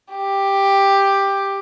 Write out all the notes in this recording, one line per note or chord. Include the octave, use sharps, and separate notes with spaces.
G4